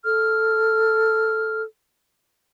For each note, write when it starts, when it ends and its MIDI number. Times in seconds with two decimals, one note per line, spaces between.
0.04 1.62 69
0.04 1.62 89